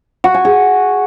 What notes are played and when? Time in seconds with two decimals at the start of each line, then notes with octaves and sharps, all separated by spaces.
0.24 F#4
0.34 G#5
0.45 G#4